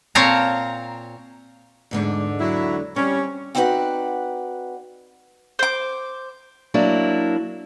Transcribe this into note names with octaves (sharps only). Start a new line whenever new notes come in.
A#2 C4 C#5 F5 A5 A#5
E2 G#2 D3
F#3 E4
G3 C4 C#4
C4 D#4 F#4 B4 D5 F#5
C5 D6
F#3 A#3 D4 E4